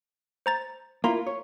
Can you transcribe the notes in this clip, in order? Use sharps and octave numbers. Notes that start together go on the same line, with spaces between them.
C5 A#5 A6
A#3 E4 F4 F5 A#5 C6
C#5